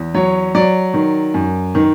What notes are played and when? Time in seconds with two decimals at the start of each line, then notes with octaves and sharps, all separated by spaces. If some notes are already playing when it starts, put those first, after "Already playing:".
Already playing: E2
0.14 F#3 C#5
0.55 F#3 D5
0.94 D#3
1.34 F#2
1.75 D#3